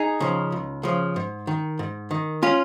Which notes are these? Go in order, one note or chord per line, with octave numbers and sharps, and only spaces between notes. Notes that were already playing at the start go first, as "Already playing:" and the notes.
Already playing: D#4 G#4
C#3 F3
C#2
C#3 F3
G#2
D#3
G#2
D#3
C#4 F4